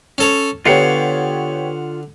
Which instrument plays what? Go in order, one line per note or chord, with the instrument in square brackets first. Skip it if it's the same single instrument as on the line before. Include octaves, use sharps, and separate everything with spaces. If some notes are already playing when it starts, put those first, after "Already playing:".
[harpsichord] C#4 A4 C#5
[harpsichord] D3 [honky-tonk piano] B3 G4 C#5 [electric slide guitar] F4 F5 F#5